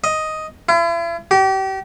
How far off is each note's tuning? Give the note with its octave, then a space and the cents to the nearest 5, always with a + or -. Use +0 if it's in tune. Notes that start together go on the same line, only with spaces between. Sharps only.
D#5 +5
E4 +45
G4 -35